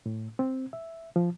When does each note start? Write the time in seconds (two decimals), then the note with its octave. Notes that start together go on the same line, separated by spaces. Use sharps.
0.06 A2
0.39 C4
0.73 E5
1.16 F3